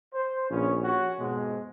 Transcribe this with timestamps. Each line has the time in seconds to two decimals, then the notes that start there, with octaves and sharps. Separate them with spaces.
0.14 C5
0.50 A#1 C#3 B3 C#4
0.84 C#4 F#4
1.19 F2 G#2 B2 G#3